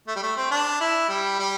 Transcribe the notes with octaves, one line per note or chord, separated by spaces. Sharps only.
A3
G3
A3
C4
D4
E4
G3
G3